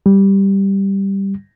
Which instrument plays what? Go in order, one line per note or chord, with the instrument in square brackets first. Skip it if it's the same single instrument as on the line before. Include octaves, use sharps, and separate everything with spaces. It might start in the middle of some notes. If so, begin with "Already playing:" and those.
[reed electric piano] G3